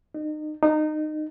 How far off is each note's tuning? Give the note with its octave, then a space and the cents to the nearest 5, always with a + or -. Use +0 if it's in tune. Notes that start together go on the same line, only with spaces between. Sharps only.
D#4 -30
D#4 -20